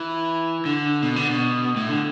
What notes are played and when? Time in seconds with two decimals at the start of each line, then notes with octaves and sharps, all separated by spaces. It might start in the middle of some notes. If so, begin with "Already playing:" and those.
Already playing: E3
0.65 D3
1.02 B2
1.16 D3
1.29 B2
1.76 A2
1.88 D3